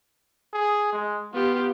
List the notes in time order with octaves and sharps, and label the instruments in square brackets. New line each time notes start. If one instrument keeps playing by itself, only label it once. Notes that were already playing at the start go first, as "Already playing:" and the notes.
[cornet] G#4
G#3
[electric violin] B3 G4 [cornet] F4